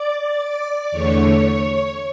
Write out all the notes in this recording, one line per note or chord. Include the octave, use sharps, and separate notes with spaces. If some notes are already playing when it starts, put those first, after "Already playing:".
Already playing: D5 D6
D5 D6
E2 D3 A3 C#5 C#6